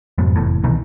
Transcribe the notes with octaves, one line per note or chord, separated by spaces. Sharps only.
F2 G#2 B2
F1 E2 A2
C2 B2 D#3 E3